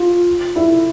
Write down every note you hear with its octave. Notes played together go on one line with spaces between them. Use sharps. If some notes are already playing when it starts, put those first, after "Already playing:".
Already playing: F4
E4